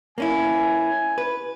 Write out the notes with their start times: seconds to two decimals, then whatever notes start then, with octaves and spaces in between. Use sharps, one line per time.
0.18 A#3 C#4 E4 G#5
1.18 B4